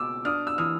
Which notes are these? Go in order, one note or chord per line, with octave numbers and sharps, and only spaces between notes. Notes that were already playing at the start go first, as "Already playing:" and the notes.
Already playing: C#2 B2 D6 E6
D4 D#6 F6
E6
E3 D#6 F6